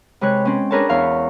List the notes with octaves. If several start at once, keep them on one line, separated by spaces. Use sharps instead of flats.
C3 G#3 B4 C#5 F#6
C4 C#4
D4 G#4 A#4 B4 C#5 A5
E2 C#5 F5 C#6